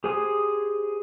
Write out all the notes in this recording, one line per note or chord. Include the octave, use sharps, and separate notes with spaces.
G4 G#4 C5 G#5 D#6